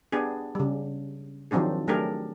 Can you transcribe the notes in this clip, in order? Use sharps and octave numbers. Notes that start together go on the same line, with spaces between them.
B3 D4 G4 G#4
C#3 G3
D#3 F3 F#3 C4 D4 G#4
F#3 A3 D4 G4 G#4 A#4